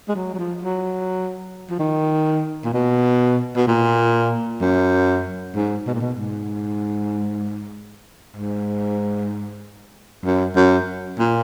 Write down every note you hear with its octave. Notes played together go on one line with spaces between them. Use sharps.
G#3
F#3
F#3
F3
F#3
F3
D#3
A#2
B2
B2
A#2
F#2
G#2
B2
A#2
B2
G#2
G#2
F#2
F#2
A#2